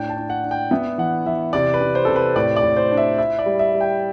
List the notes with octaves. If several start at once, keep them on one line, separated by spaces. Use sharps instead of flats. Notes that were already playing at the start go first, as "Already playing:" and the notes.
Already playing: A2 D4 G5
A5
D4
F#5
D4
G5
B3 E5
E3 F#5
E3 E5
C3 D5
B4
C3
C5
C3 A4
B4
A2 D5
D5
A2
C5
D4
E5
E4 E5
D5
G3
E5
G3
G5